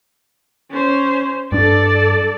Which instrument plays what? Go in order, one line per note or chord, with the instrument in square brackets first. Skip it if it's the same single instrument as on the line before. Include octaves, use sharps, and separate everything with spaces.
[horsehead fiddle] C#4 C5
[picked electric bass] G2 D4 [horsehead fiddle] A4 D5